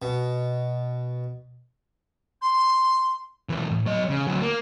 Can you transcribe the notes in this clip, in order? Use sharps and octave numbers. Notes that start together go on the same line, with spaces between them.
B2
C6
B1 E3
A2
F#3 D#5
C#3
D2 F#3
A#3